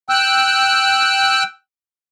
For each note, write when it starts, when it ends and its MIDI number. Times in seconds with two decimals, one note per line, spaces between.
0.09 1.43 79
0.09 1.43 88
0.09 1.43 90